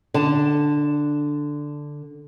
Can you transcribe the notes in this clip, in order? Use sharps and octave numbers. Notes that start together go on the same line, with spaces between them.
D3 A5